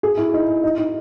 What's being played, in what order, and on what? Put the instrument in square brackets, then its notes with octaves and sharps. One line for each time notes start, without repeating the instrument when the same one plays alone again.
[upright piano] G#4
E4
D#4
D#4
D#4